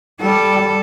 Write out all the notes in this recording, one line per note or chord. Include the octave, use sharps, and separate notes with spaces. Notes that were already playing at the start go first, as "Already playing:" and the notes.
G3 A4